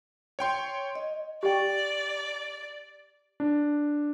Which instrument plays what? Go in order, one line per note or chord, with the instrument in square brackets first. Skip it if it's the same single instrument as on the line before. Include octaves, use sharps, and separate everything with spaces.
[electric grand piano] C#5 G5 C6
[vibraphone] D#5
[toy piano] G4 G5 [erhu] D5
[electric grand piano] D4